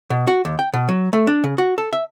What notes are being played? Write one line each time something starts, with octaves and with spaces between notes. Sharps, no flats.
B2
F#4
D#2
G5
B2
F#3
A3
D4
C#3
F#4
A4
E5